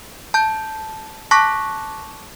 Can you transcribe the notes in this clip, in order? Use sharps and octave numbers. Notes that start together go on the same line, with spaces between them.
A5 G6
A5 C#6 D6 F#6 A#6 B6